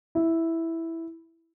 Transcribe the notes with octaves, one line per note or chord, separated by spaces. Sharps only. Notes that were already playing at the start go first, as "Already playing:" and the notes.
E4